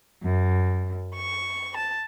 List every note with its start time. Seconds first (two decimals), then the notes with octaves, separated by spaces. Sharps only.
0.24 F#2
1.16 C#6
1.77 A5